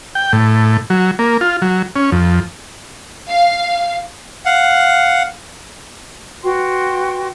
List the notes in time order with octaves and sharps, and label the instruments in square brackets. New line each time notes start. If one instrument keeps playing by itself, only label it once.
[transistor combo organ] G5
A2
F#3
A#3
F4
F#3
C#4
F2
[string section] F5
[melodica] F5 F#5
[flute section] F#4 B4 G5 C6